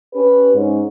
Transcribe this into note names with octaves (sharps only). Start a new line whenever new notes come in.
C#4 G4 B4
G#2 C#4